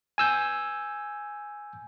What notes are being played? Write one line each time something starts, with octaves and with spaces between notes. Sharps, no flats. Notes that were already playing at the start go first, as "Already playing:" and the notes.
G#5 E6 G6